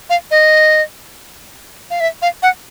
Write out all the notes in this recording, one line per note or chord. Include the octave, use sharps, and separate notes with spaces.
F5
D#5
F5
E5
F5
F#5